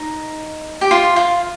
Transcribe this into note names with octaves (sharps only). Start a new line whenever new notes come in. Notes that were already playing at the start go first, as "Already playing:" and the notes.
Already playing: D#4
G4
F4
F4